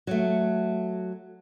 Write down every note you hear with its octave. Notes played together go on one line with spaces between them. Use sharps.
F#3 A3